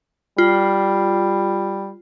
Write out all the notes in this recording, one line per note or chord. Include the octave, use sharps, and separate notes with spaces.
G3 F4